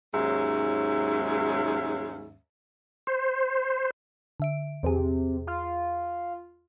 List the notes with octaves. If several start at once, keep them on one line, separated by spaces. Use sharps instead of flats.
D#2 G#2 F#3 G#3 C#4 E5
C5
D3 E5 D7
E2 C3 G#4
F4